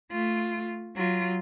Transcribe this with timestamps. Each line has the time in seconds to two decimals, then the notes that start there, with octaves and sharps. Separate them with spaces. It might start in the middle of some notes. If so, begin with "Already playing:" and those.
0.11 A3 F4
0.95 F#3 F4